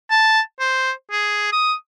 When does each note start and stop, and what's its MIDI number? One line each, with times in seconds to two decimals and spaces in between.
0.11 0.40 81
0.60 0.92 72
1.11 1.52 68
1.52 1.74 87